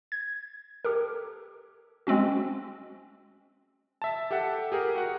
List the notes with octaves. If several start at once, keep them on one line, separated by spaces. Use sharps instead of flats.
G#6
G4 A4 A#4
G#3 C4 C#4 F#4
E5 A5
G4 A4 E5 F#5
G4 G#4 A#4
F#4 F#5